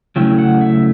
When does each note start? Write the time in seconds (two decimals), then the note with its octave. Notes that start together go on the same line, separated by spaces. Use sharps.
0.16 C#3 F#3 A3 C#4 E4 G5
0.38 F#5
0.61 E5